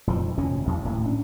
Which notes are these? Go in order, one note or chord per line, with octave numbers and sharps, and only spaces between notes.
D#1 F2 D#3 F3
F1 D2 A#2 C#4
A1 E2
D1 A2 A#3
C#4 D4